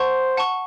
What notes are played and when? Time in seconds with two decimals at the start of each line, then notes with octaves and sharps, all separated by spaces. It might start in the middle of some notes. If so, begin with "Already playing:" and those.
Already playing: C5 F#5 A5 C#6
0.37 F#5 A5 C#6